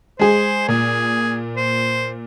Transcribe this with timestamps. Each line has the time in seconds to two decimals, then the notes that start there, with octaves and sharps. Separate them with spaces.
0.19 G#3 G#4 C5
0.68 A#2 G#4
1.57 C5